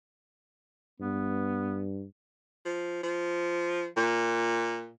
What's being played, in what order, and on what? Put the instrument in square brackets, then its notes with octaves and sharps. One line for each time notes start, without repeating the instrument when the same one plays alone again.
[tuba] G2 [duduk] B3
[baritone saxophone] F3
F3
A#2